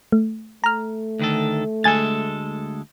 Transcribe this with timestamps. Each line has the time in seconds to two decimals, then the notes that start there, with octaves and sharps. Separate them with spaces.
0.12 A3
0.64 A3 A#5 F6
1.19 D2 D#3 A4
1.84 D2 G#3 A4 G#5 A6